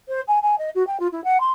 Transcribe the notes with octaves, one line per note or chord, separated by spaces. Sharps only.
C5
G#5
G#5
D#5
F#4
G5
F4
E4
F#5
C6